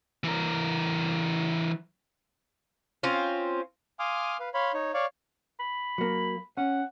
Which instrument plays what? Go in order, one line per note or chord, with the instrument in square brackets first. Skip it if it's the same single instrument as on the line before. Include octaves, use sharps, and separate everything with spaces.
[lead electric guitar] E3 A#4
[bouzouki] C4 C#4 F4
[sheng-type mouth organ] F5 G#5 C6 D6 D#6 F6
B4 F5
C#5 F5 B5 C6
D#4 C#5
C#5 D5 F5 C#6
[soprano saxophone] B5
[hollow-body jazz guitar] F#3 A#3
[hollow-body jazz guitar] C#4 [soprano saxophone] F#5